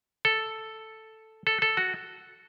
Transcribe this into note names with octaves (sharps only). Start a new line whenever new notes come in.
A4
A4
A4
F#4